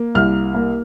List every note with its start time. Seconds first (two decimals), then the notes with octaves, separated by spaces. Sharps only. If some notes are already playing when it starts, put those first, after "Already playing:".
Already playing: A#3
0.15 C2 F6
0.54 A#3